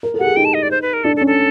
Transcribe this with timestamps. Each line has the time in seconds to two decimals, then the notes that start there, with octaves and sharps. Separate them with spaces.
0.03 A#4
0.14 A4
0.19 G4 F#5
0.25 G#4
0.36 D#4 G5
0.45 A5
0.54 D#5
0.63 D5
0.71 C5
0.82 B4
0.93 A#4
1.04 D4 A4
1.16 A4
1.21 C#4
1.27 A4